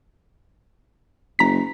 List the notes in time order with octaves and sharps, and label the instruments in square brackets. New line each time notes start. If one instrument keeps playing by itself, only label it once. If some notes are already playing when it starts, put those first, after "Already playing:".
[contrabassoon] F#1 [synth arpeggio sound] A#5 B6